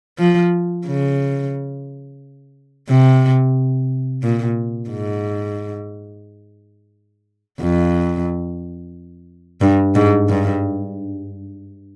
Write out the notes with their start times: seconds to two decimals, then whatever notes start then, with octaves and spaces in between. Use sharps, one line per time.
0.19 F3
0.86 C#3
2.89 C3
4.23 A#2
4.90 G#2
7.60 F2
9.61 G2
9.95 G#2
10.29 G2